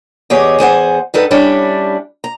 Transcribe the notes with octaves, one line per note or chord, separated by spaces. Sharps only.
E2 G4 G#4 C#5 D#5
E2 G#4 C5 F#5
G2 D#4 A4 B4 F#5
G3 C#4 D4 E4
A#5